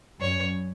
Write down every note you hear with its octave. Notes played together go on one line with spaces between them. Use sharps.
F#2 C#5